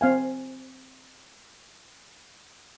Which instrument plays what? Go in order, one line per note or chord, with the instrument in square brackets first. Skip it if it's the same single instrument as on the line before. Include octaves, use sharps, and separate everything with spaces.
[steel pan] C4 F5 G#5